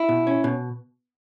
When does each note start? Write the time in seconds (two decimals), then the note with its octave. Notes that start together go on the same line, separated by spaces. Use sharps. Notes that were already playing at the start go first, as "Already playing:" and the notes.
Already playing: E4
0.09 B2
0.27 C#4
0.44 B2